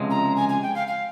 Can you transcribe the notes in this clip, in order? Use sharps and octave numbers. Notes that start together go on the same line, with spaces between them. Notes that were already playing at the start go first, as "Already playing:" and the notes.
Already playing: C#2 C3 F3 G#3
A#5
G#5
G#5
G5
F5
F5